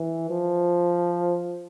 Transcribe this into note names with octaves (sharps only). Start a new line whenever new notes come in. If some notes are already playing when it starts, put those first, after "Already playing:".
Already playing: E3
F3